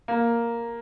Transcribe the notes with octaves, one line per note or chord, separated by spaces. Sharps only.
A#3